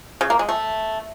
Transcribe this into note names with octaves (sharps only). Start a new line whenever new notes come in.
C#3
A#3
G#3
A3